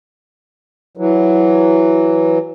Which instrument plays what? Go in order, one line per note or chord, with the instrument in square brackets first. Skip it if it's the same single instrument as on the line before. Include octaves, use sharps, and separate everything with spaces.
[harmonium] E3 F#3